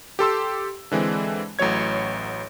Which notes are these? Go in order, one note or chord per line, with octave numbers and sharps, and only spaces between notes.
G4 A4 C6 E6
D3 E3 G#3 C4
A1 A2 F#3 C#5 G#6